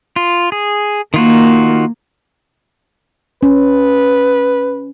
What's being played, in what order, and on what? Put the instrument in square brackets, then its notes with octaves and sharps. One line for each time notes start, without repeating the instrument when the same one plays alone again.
[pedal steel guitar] F4
G#4
[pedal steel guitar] D#3 F4 F#4 [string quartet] A#3
[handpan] C#4 [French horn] B4